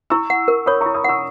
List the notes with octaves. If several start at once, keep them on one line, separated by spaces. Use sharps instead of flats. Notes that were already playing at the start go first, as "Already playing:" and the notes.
E4 C#6 E6
F#5
A#4
C#5 B5 D#6
A#5 C#6
E4
B5 D#6
F#5 C#6 E6